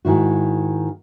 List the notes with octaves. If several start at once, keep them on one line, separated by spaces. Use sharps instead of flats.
G#2 D#3 E4 F#4